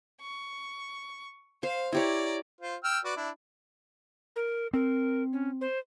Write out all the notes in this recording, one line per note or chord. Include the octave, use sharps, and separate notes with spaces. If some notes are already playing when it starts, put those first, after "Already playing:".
C#6
C5 F5
E4 G4 C#5 D5 A#5
F4 C5
G5 E6 F6
F#4 B4 D5
D4 E4
A#4
C4 A#4
C#4
C5